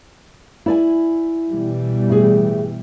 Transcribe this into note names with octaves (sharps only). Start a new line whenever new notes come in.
E4 D5 G#5
B2 E3 G3
A2 G#4